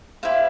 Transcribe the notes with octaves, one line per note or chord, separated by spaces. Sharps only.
E4 G4 C5 F5